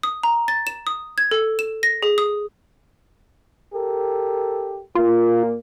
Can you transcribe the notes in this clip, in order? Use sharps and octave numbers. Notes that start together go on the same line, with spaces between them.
D#6
A#5
A6
E7
D#6
G#6
A4
E7
A#6
G#4
D#6
G4 A4 A#4
A#2 A#3 F4